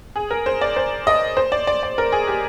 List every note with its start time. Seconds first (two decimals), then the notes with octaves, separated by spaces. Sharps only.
0.16 G#4
0.31 A#4
0.46 C5
0.61 D5
0.76 C5
1.07 D#5
1.37 C5
1.52 D5
1.67 D5
1.83 D5
1.98 A#4
2.12 G#4
2.27 G4